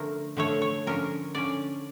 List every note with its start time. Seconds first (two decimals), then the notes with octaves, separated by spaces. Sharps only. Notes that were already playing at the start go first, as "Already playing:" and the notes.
Already playing: D3 F3 A3 A#4
0.37 D3 F3 A3 C#5
0.62 C#5
0.87 D3 F3 C#4 A#4
1.35 D3 F3 C#4 D5